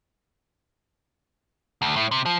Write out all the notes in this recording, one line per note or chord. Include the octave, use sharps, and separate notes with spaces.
D2
A2
C3
F3